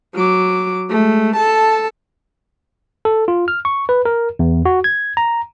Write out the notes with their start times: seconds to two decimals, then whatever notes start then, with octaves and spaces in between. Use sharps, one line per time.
0.15 F#3 D6
0.90 G#3 A3
1.37 A4 A5
3.05 A4
3.28 F4
3.48 F6
3.65 C#6
3.89 B4
4.05 A#4
4.39 E2
4.66 F#4
4.84 G#6
5.17 A#5